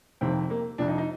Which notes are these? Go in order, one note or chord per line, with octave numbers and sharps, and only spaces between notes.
F2 C3 D#3 C4
A#3
F2 C3 F3 D4
D#4
D#4